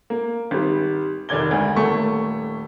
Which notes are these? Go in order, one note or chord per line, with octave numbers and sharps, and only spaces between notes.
A#3
G#1 G3
F1 D#3 D5 G#6 G7
D2 G#3
D#1 A3 A#3 C#6